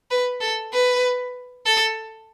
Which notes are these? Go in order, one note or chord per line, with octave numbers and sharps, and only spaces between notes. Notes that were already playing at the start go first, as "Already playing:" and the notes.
B4
A4
B4
A4